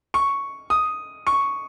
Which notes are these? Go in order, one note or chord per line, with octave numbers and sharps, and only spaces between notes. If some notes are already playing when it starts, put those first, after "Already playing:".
C#6
D#6
C#6